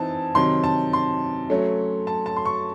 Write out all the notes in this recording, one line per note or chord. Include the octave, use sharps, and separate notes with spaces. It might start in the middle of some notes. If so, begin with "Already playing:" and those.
Already playing: E3 C4 D#4 A5
C3 D#3 F#3 C6
A5
C6
F#3 A3 C#4
A5
A5
C6
C#6